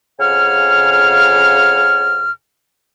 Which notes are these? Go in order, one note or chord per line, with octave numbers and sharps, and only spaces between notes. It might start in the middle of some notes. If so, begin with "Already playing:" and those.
F2 C#3 F#5 G#5 F6